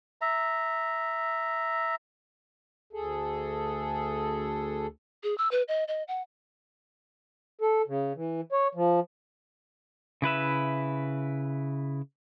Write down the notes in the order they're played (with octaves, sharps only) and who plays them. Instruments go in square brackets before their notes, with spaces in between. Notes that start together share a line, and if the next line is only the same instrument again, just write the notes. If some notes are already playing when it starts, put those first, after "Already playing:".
[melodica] E5 A#5
[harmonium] D2 G#4 A4
[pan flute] G#4
E6
B4
D#5
D#5
F#5
[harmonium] A4
C#3
E3
C#5
F3
[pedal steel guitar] C#3 E4 B4 E5